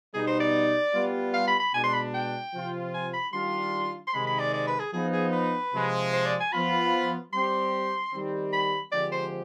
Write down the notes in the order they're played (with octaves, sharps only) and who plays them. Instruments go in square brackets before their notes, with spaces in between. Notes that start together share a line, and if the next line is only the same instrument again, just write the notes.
[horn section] B2 G3 B3 D#4 [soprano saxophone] G#4
[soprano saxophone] C5
D5
[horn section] G3 B3 F4
[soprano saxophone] F5
B5
B5
[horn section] B2 G#3 D4 [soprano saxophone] G#5
[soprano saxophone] C6
B5
G5
[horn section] C3 F3 C4 F4
[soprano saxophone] G#5
B5
[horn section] D#3 G3 D4 F4 [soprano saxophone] C6
[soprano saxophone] C6
[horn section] C3 D#3 G#3 [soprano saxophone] B5
[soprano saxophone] B5
D5
D5
B4
G#4
[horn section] F3 B3 D#4 [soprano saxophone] G#4
[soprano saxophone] G#4
B4
[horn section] C3 F3 G#3
[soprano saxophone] C5
D5
G#5
[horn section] F3 B3 F4 [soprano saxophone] B5
[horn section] G3 C4 G4 [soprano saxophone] C6
[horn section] D#3 G3 C4
[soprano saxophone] B5
[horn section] D3 F3 G#3 C4 G4 [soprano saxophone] D5
[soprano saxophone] C5